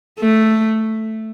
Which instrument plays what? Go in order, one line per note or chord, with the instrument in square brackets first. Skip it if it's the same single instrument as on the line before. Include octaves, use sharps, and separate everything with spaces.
[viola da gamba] A3